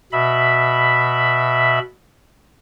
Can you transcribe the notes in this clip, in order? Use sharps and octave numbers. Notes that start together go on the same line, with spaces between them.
B2 E5 B5